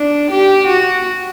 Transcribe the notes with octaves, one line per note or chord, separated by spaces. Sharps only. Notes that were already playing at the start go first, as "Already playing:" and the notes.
Already playing: D4
G4
F#4